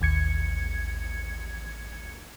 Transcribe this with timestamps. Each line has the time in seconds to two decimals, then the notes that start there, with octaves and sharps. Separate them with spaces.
0.01 A1 D#2 G#6 C#7